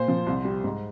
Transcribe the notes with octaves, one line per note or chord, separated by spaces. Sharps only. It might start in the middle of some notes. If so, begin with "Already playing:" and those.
Already playing: A#2 C5 C6
F3
C2
G3
G#2